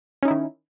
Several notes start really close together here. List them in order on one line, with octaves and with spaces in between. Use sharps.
C#4 D#4 E4 D#3